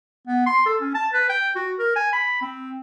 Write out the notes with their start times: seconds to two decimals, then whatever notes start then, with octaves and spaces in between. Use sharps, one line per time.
0.27 B3
0.46 C6
0.66 A4
0.81 C#4
0.95 A5
1.13 B4
1.29 G5
1.55 F#4
1.79 A#4
1.96 G#5
2.13 B5
2.42 C4